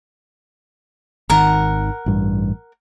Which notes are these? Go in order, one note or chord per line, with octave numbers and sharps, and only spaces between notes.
G#1 D#3 A#4 F#5
A1 G2